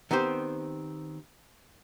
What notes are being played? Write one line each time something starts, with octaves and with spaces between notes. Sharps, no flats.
D#3 B3 C4 G4 C5